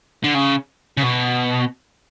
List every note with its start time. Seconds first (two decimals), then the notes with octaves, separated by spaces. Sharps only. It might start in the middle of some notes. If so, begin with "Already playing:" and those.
0.24 D3
0.35 C#3
0.98 C#3
1.03 B2